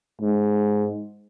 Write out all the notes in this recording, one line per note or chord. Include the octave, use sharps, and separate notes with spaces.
G#2